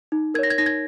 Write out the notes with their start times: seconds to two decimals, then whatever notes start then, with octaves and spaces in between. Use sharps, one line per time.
0.12 D#4
0.34 A#4 G#6
0.39 C#5 A#6
0.50 G#6
0.58 D#4 A#6
0.66 G#6